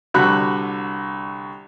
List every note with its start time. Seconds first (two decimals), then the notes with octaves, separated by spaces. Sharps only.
0.14 C2 D3 F#4 B5 F#6